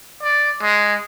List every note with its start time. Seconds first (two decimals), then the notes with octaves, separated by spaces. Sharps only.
0.23 D5
0.63 G#3